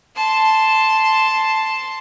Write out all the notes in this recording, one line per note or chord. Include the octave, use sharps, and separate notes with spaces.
A5 C6